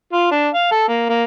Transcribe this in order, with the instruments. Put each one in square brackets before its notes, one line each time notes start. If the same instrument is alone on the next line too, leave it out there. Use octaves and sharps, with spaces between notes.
[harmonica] F4
D4
F5
A4
A#3
A#3